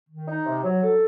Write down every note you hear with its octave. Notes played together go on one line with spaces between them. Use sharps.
D#3
D#4
C3
F#3
A4